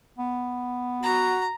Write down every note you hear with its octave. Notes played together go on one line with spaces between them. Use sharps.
B3
F#4 A#5